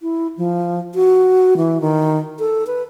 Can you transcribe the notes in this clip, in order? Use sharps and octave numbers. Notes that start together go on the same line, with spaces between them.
E4
F3
F#4
E3
D#3
A4
B4